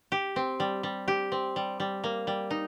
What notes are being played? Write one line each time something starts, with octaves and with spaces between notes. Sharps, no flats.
G4
C4
G3
G3
G4
C4
G3
G3
A#3
G3
D#4